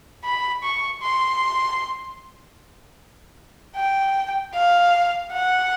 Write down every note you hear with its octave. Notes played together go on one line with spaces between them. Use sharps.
B5
C#6
C6
G5
F5
F#5